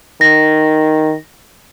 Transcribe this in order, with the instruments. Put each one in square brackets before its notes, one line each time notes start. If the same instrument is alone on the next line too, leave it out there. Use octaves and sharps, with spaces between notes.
[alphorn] D#3 [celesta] A#6